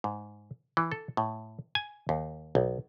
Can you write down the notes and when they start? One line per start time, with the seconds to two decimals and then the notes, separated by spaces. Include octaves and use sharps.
0.04 G#2
0.77 E3
0.92 A4
1.17 A2
1.75 G#5
2.09 D#2
2.55 B1